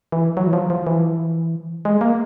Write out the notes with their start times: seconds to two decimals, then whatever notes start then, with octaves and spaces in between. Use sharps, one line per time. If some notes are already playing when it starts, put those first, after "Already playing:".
0.12 E3
0.37 F#3
0.47 E3
0.53 F3
0.70 F3
0.87 E3
1.85 G#3
2.01 A#3